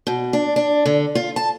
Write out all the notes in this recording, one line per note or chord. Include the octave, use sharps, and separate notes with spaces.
B2
D4
D4
D3
F4
A5